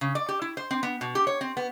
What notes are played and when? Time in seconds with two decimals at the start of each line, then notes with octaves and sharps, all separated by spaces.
0.01 C#3
0.15 D5
0.29 G4
0.42 E4
0.57 C5
0.71 C4
0.83 B3
1.01 B2
1.15 G4
1.27 C#5
1.41 C4
1.57 B3